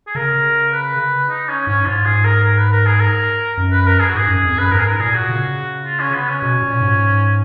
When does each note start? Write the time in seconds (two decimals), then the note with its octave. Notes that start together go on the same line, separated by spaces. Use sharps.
0.07 G#4
0.15 C#3 A#4
0.72 B4
1.30 D#4
1.49 C#4
1.67 G#2 C#4
1.86 G#2 F4
2.05 G#4
2.24 A#4
2.43 A#4
2.58 B4
2.72 A#4
2.86 G#4
3.00 A#4
3.57 F#2
3.72 B4
3.86 A#4
4.00 G#4
4.09 F#4
4.15 G#2 G#4
4.28 F#2
4.43 F2
4.57 F#2 B4
4.71 G#2 A#4
4.79 G#4
4.86 A#4
4.99 A#2 G#4
5.15 F#4
5.29 C#3
5.85 F4
6.00 C#4
6.14 B3
6.28 C#4
6.42 B2
6.62 A#2
6.81 G#2